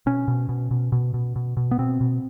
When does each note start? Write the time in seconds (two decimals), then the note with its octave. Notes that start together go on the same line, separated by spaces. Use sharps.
0.06 B2 C#4
0.28 B2
0.49 B2
0.71 B2
0.92 B2
1.14 B2
1.36 B2
1.57 B2
1.71 B3
1.78 B2 C4
2.01 B2